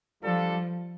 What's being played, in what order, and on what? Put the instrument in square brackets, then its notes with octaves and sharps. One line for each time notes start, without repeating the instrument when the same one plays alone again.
[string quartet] F3 [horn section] G3 D4 F4 A4